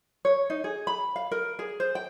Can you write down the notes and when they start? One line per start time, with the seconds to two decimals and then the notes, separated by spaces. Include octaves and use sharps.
0.25 C#5
0.50 D#4
0.64 G#4
0.87 B5
1.16 F5
1.31 A#4
1.59 G#4
1.80 C5
1.95 G5